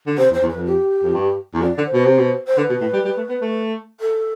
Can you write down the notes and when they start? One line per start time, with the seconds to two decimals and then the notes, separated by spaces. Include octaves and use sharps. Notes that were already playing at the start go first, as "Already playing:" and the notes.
0.07 D3
0.18 C3 C5
0.30 E2
0.33 C5
0.42 E2
0.50 F2 B4
0.66 G4
1.03 F2
1.14 G2
1.54 E2
1.61 F2 D5
1.78 D3
1.86 C5
1.93 B2
2.05 C3
2.18 B2
2.47 C5
2.57 D3 B4
2.69 B2
2.81 A2
2.93 G3
3.05 G3
3.17 A3
3.29 B3
3.41 A3
4.00 A4